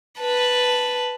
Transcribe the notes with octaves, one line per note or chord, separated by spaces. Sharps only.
B4 A5